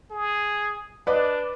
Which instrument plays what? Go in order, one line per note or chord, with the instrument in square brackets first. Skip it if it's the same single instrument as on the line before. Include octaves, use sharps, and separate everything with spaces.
[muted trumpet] G#4
[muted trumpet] D4 [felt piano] B4 D5 D#5